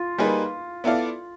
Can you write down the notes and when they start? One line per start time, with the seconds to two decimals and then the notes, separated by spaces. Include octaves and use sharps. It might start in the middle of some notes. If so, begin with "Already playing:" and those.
Already playing: F4
0.18 G3 A#3 D#4 G#4 B4
0.84 B3 E4 A4 D5 F5